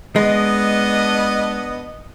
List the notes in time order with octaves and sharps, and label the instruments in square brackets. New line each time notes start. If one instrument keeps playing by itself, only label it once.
[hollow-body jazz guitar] G#3 [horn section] B3 D4 D#5